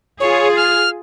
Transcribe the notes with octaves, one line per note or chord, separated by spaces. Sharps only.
F4 G#4 C#5
F6